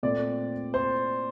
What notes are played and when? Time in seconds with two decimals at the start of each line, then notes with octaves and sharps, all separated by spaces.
0.03 A#2 A3 C4 D5
0.74 C5